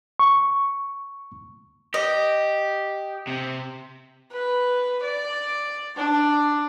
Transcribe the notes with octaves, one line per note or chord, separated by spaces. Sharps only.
C#6
G4 D#5
C3
B4
D5
D4 D5